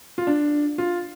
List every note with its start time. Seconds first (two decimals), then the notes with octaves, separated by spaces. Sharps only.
0.18 F4
0.27 D4
0.78 F4